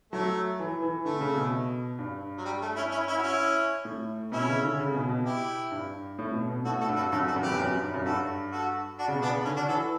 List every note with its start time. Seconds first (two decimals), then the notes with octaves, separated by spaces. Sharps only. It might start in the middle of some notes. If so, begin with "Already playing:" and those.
0.12 F#3 A3
0.59 E3
0.82 E3
1.05 D3 A3
1.21 C#3
1.37 B2
1.99 G2
2.38 F#3
2.45 G3
2.62 A3
2.76 C#4 E4
2.92 C#4 E4
3.08 C#4 E4
3.18 F#4
3.23 C#4 E4
3.85 A2
4.31 B2 C#4 E4
4.48 C#3
4.63 D3
4.79 C#3
4.94 B2
5.09 B2
5.25 E4 G4
5.71 G2
6.19 A2
6.34 B2
6.50 B2
6.65 A2 F#4 A4
6.80 F#4 A4
6.89 G2
6.96 F#4 A4
7.11 F#2 F#4 A4
7.24 G2
7.27 F#4 A4
7.36 F#2
7.43 E2 G4 B4
7.59 F#2
7.82 G2
7.94 F#2
8.05 G2 F#4 A4
8.52 F#4 A4
8.99 D4 F#4
9.08 C#3
9.14 B2
9.22 B3 D4
9.29 C#3
9.45 D3 C#4
9.56 D4 F#4
9.68 E3 F#4 A4